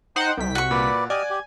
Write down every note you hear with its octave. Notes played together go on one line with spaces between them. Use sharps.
D#4 C5 F#5 G5
C2 B6
F#4 C#6
A#2 B4 D5
G4 D5 D#5 G#5 F6
G4